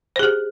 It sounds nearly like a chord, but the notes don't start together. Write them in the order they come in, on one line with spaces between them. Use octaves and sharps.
C5 G#4 G4